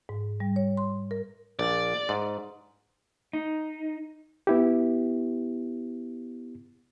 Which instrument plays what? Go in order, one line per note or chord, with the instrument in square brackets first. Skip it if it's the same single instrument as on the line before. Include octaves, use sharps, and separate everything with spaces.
[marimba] G#2
G3
C#5
C6
A#4
[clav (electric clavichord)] A#1 [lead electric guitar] D5
[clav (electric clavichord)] G#2
[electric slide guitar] D#4
[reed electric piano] B3 E4 G4